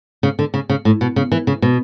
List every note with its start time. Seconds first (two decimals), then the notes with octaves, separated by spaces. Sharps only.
0.23 C#3
0.39 D3
0.54 C#3
0.70 C#3
0.85 A2
1.01 B2
1.16 C#3
1.32 E3
1.47 C#3
1.62 B2